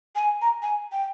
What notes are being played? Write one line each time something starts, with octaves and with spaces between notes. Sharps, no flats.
G#5
A#5
G#5
G5